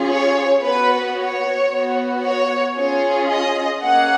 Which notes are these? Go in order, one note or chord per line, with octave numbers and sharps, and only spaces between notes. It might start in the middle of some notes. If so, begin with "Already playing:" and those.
Already playing: C#4 F4 G#4
C#5
B3 F#4 B4
C#5
B3 F#4
C#5
C#4 F4 G#4 C#5
D#5
A#3 C#4 G#4 F#5